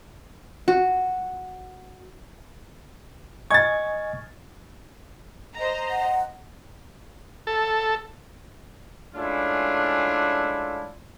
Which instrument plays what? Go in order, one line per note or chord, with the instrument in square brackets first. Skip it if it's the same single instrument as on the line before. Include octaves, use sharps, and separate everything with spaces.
[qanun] F#4
[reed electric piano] D#5 G#5 C#6 [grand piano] G#6 A6
[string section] C5 D#5 A#5
[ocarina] F#5
[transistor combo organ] A4
[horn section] G#3 A3 C#4 D4 E4 F4